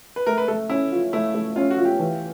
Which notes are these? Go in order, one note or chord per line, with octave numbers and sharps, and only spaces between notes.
B4
A3 A#4
B4
A3 A4
C#4 E4
F4
A3 E4
A3
C#4 F4
F#4
F4
G4
E3